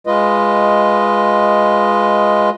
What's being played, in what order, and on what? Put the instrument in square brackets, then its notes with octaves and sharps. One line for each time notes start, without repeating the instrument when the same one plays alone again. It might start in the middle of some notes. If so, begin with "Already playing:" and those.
[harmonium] G#3 F4 B4 D#5